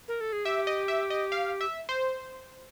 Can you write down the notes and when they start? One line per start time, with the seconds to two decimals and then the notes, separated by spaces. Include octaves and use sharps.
0.08 A#4
0.21 A4
0.33 G#4
0.45 G4 E5
0.67 D#5
0.88 E5
1.10 D#5
1.32 F5
1.61 E5
1.89 C5